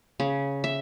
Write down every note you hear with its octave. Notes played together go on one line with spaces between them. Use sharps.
C#3
E5